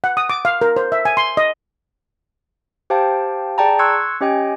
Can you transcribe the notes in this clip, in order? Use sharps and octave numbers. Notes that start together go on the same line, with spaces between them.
F#5
D#6
D6
F5
A#4
C5
E5
G#5
C6
D#5
G4 C5 F5 G5 A5
G#4 D5 G5 A5 A#5
C6 C#6 E6 F#6 G#6 C#7
C#4 G4 D#5 G5 G#5